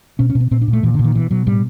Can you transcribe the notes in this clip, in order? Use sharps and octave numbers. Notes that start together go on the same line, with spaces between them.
B2 C#4
C#4
B2
C4
A#2 C4
D4
A#2
A3
A#2 E3
D3
A#2
D#3
B2 E3
B2 F#3
A2 G3